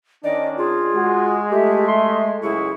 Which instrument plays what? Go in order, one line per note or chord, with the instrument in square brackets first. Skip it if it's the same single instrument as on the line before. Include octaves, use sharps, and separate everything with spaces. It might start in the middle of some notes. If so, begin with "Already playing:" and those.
[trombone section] D#3 C#4 D4 [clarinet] D5 [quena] D#5
[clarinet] F4 [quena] G#4
[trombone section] G#3 [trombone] F#4
[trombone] A3 [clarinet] G4 [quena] E5
[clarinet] C6
[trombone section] C#2 F#2 E4 [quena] G#4 [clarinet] C#6